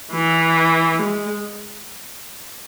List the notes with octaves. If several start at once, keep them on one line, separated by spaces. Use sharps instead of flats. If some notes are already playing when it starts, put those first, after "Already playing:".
E3
G#3